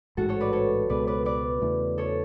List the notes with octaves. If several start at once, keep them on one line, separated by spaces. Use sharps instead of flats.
A1 G#2 G#3 F#4 A4
A4 C#5
B4 D5
A4 C#5
C#2 B2 G#3 B4 D5
B4 D5
B4 D5
E2 C#3 E3 A3
A4 C#5